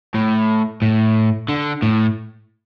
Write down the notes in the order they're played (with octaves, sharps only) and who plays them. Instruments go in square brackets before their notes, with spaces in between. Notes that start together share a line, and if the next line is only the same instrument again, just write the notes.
[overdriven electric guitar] A2
A2
D3
A2